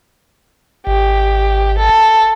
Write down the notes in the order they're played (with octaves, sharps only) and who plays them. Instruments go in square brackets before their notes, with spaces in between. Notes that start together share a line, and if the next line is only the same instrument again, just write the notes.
[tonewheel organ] G#1 [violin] G4
[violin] A4